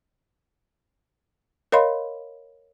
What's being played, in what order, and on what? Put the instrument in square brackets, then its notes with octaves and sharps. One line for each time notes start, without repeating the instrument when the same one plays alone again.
[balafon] A#4 C#5 D#5 F5 B5 C6